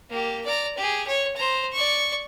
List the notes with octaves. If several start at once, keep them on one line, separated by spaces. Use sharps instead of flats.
A#3 G4
D5 A#5
G4 G#4
C#5
C5 A#5
D5 C#6